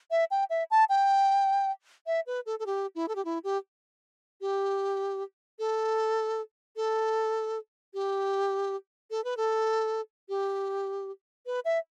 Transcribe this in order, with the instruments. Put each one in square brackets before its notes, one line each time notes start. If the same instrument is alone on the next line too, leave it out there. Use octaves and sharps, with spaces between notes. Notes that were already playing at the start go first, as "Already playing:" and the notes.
[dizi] E5
G5
E5
A5
G5
E5
B4
A4
A4
G4
E4
A4
G4
E4
G4
G4
A4
A4
G4
A4
B4
A4
G4
B4
E5